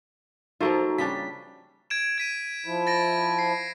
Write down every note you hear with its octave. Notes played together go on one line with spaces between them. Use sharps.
F3 A#3 D#4 F4 F#4 A4
C#3 G3 D4 B6
G#6 D7 E7
G#6 B6 D#7
F3 E4
A6 A#6 D7
C7